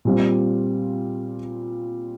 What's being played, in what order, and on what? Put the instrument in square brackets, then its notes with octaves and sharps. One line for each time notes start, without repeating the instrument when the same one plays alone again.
[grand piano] A#2 G3 C4 F4